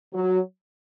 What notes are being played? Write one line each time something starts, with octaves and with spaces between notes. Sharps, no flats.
F#3